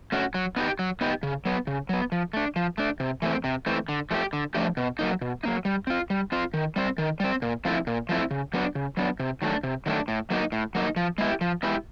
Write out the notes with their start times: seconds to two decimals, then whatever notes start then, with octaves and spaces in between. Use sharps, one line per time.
0.12 A3 C#4 F#4
0.34 F#3
0.56 B3 D#4 G4
0.79 F#3
1.01 B3 D#4 G4
1.23 C#3
1.45 F#3 B3
1.67 C#3
1.89 F#3 B3
2.12 F3
2.33 A3 D4
2.56 F3
2.78 A3 D4
3.00 C3
3.22 E3 A3 C4
3.44 C3
3.66 E3 A3 C4
3.89 D3
4.11 F3 A3 D4 G4
4.33 D3
4.55 F3 A3 D4 G4
4.77 B2
4.99 F#3 A#3 D#4
5.21 B2
5.43 F#3 A#3 D#4
5.65 G3
5.87 C4 F4
6.10 G3
6.32 C4 F4
6.54 D#3
6.76 G3 C4
6.98 D#3
7.20 G3 C4
7.42 A#2
7.65 F3 A3 C4 E4
7.87 A#2
8.09 F3 A3 C4 E4
8.31 C#3
8.53 F#3 B3 D4
8.75 C#3
8.97 F#3 B3 D4
9.20 C3
9.42 D#3 F#3 A3 D4
9.63 C3
9.86 D#3 F#3 A3 D4
10.08 A2
10.30 F#3 A#3 D#4
10.52 A2
10.75 F#3 A#3 D#4
10.96 F3
11.18 G#3 B3 E4 G4
11.41 F3
11.63 G#3 B3 E4 G4